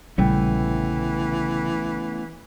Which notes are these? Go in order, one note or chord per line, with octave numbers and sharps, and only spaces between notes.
A#1 C#3 E3 G3 A3 B3 C#4 G5